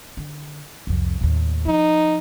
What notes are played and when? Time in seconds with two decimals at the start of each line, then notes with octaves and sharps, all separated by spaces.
0.17 D3
0.87 C2 F2
1.21 D#2 A2
1.66 F3 D#4